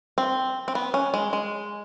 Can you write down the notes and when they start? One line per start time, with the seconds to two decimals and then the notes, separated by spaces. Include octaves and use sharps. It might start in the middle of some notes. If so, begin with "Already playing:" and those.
0.18 C4
0.68 C4
0.75 B3
0.94 C#4
1.14 G#3
1.33 G#3